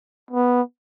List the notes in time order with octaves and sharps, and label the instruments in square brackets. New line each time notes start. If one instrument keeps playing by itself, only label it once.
[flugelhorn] B3